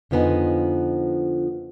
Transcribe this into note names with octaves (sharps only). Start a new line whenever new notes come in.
F2 D3 F3 B3 D#4 G#5